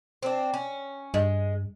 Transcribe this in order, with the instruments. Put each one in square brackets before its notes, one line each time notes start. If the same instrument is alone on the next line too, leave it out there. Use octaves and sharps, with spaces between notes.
[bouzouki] C4 D4
C#4
[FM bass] G2 [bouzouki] G#3